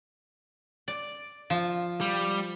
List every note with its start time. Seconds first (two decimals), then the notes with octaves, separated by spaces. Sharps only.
0.88 D5
1.50 F3
2.01 G3